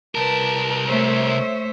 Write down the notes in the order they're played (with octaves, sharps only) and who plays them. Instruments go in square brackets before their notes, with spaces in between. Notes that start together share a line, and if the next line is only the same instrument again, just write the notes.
[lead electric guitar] C2 A#4 [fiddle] B4 A5
[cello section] A3 C#5 E5 [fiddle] C5